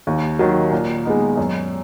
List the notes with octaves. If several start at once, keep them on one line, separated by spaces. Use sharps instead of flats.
D#2
D#3 F#3
A#2
G#3 B3 D#4
F#2